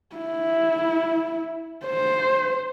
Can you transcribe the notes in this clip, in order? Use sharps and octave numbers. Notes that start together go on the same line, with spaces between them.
E4
C5